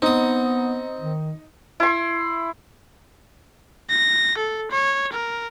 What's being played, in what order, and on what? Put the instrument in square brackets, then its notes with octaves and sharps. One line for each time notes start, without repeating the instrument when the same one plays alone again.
[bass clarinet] B3 [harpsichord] C4 D#6 [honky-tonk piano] D#4
[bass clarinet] D#3
[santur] E4 C6
[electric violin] A#6
A4
C#5
A#4